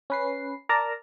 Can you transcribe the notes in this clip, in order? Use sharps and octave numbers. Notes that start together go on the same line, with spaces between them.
C#4 B4 C7
A#4 D5 A5 A#5